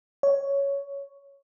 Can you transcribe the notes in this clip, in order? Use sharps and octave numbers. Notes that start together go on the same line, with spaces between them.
C#5